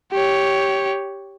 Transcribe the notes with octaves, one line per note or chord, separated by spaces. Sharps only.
G4 C#5